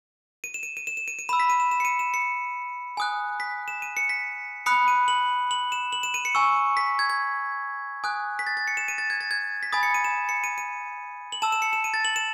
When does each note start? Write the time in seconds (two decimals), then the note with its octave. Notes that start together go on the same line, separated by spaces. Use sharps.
0.44 D#7
0.54 E7
0.63 D#7
0.77 D#7
0.87 E7
0.97 E7
1.08 D#7
1.19 D#7
1.29 B5 E6 E7
1.40 B6
1.50 D#7
1.60 E7
1.71 E7
1.80 C#7
1.85 D#7
1.99 E7
2.14 C#7
2.97 G#5 D#6 F#6
3.40 B6
3.68 E7
3.82 D#7
3.97 C#7
4.09 B6
4.66 B5 D#6 F#6 C#7
4.88 D#7
5.08 F#7
5.51 F#7
5.72 E7
5.93 F#7
6.03 E7
6.14 D#7
6.25 C#7
6.35 G#5 C#6 E6
6.77 B6
6.99 G#6
7.10 G#6
8.04 G#5 D#6 F#6
8.39 B6
8.47 A6
8.57 A6
8.67 C#7
8.77 E7
8.88 D#7
8.98 A6
9.10 G#6
9.21 A6
9.31 G#6
9.63 B6
9.72 G#5 B5 D#6 A6
9.83 C#7
9.94 D#7
10.04 E7
10.29 C#7
10.44 D#7
10.58 D#7
11.32 F#7
11.42 A5 E6 E7
11.52 E7
11.62 C#7
11.73 E7
11.84 D#7
11.94 A6
12.05 F#7
12.16 E7